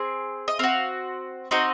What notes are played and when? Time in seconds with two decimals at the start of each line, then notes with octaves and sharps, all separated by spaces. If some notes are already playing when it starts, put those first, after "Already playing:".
Already playing: C4 G#4
0.48 D#5
0.59 C4 F#4 F5
1.51 C4 D#4 F#4 D#5